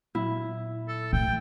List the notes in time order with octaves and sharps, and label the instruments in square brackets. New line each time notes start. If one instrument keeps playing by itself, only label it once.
[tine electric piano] A#2 F#3 [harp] E4
[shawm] A4
[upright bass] A2 [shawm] G5